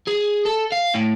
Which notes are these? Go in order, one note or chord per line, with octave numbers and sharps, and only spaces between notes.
G#4
A4
F5
A2